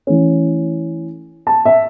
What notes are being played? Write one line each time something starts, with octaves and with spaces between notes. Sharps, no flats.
E3 A3 C#4
A5
E5